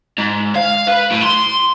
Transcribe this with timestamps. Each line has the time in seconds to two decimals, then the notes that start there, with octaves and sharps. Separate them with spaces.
0.18 G#2
0.55 F5
0.88 B4
1.12 A2
1.24 C6